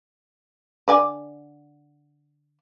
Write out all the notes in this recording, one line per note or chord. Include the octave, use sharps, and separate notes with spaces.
D3 D5 G#5